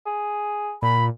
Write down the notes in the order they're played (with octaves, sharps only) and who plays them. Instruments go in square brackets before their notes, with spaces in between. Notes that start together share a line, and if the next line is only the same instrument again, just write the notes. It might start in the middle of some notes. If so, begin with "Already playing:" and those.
[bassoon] G#4
[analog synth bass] A#2 [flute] B5